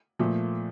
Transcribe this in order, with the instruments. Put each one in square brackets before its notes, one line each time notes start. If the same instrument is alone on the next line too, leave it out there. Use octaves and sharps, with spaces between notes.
[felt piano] A#2 F3 A3